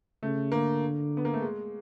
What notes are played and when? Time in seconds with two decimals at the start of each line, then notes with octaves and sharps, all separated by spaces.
0.23 C#3 A3
0.52 D3 A#3
1.17 B3
1.25 A#3
1.34 A3
1.42 G#3